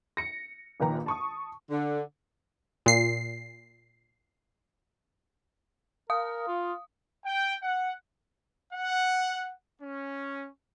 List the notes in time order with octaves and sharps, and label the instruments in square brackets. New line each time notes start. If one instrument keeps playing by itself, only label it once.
[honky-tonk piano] A#6 C#7
A#1 A#2 D#3 B4 G5 A#5
A5 C#6 D#6
[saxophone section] D3
[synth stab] A#2 C7
[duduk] A#4 [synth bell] F5 D#6
[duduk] F4
[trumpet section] G5
F#5
F#5
C#4